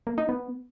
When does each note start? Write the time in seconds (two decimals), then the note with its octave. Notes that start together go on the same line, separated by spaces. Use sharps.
0.07 A#3
0.18 D#4
0.29 B3